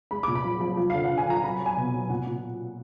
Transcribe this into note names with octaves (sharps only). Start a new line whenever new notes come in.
G#3 B5
A#2 D6
B5
F3
F3
F3
D3 F5
F#5
D3
G#5
F3 A#5
F#3 B5
F#3
G#5
B2
F#3
A#2 F#5
A#2